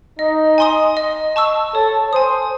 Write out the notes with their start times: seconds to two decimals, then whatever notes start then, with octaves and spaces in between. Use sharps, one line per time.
0.19 D#4 D#5
0.58 G#5 C6 D#6
0.97 D#5
1.36 A5 C#6 E6
1.74 A4 C#5
2.13 C5 G#5 D#6